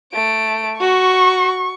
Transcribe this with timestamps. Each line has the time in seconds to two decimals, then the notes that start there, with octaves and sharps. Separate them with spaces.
0.12 A3 D7
0.81 F#4 C#6